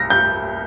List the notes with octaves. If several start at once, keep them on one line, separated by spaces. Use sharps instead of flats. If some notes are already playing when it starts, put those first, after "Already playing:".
Already playing: C2 A#6
G6